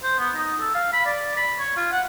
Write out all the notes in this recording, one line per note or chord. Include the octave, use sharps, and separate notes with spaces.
C5
B3
D#4
A4
F5
B5
D5
B5
C#5
F4
F#5